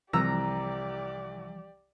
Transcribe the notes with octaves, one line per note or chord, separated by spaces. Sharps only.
C2 E3 F3 G3 G4 D5 A#5 E6